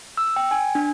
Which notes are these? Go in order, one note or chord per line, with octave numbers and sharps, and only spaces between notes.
E6
G5
G#5
D4